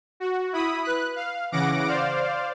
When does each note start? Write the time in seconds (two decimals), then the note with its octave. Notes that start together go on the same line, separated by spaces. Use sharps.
0.20 F#4
0.53 E4 B5 D#6
0.84 B4 F#6
1.16 F5
1.52 C#3 E3 F#5 D6 A#6 D7
1.87 C5 D5 F5